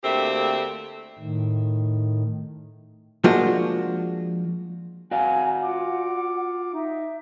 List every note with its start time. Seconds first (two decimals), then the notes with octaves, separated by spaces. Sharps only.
0.03 D2 A3 A#3 C4 G4 E5
1.19 A2 D#3
3.24 F3 G#3 A#3 D4 F4 F#4
5.11 F#4 D5 F5 G#5
5.63 F4 F#5 D6
6.74 D#4 E5